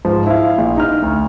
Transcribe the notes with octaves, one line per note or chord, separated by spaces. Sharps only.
G#2 F3
E4 F5
A#1
D#4 F6
D2